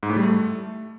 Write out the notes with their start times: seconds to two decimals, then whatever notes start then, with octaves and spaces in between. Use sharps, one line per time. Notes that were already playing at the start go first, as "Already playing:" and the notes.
0.03 G#2
0.09 A2
0.16 G3
0.23 A3